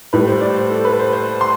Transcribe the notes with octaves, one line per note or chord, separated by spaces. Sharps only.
A2 G3 B4
C5
D5
C5
A4
B4
C5
C5
C6